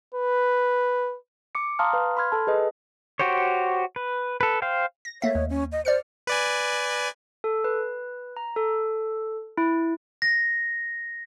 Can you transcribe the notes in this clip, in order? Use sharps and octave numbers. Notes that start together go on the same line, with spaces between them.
B4
D6 C#7
F5 A5 A#5 C6 D#6 F6
B4 F5
B5 C6 F6 G#6
A4 A5
G#4 B4 D#5
F#4 G4 C5 C#5
B4
A4 B4
C5 F5 G5
A#6
A3 A#3 C#5 E5
D#2
C#4
D#5
C5 D5 F6 C#7
B4 D5 G#5
A4
B4
A#5
A4
E4
A#6